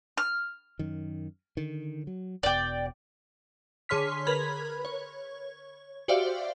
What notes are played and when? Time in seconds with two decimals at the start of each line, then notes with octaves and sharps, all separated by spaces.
0.17 F6
0.79 F#2 D#3
1.57 D3 D#3
2.07 F#3
2.43 E1 B2 D5 G5
3.89 D3 G#4 C#5 C6 F6 B6
4.27 A#4 B4 B5 G#6
4.85 C#5
6.08 F#4 G4 C5 D5 E5 F5